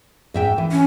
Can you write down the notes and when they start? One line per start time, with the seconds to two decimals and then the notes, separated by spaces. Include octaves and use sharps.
0.34 G#2 E5 G5
0.58 E3
0.72 C#4